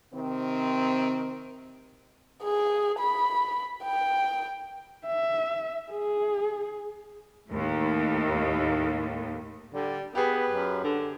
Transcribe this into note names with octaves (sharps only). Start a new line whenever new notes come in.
C3 D#3 C4
G#4
B5
G5
E5
G#4
D#2 A2
D3 G3
B3 G4 G#4 B4
F#2
D3